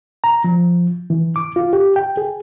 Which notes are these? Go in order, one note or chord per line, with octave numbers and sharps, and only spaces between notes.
A#5
F3
E3
D6
F4
G4
G5
G#4